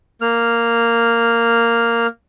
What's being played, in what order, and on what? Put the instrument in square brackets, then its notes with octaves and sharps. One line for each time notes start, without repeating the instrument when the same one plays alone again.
[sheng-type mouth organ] A#3 F6